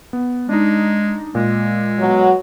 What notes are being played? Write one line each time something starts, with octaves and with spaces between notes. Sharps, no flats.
B3
G#3 D4 D#4
A#2 G#3
B2 F#3